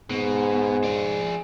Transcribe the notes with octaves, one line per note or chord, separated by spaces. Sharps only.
G#2 B2
D4 G#4